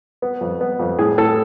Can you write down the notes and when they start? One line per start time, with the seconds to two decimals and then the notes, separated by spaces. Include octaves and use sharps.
0.22 B3
0.41 F2
0.61 B3
0.79 F2
0.99 A2 G#4
1.18 A2 A4